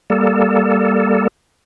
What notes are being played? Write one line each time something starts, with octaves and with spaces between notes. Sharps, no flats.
G3 A#3 A4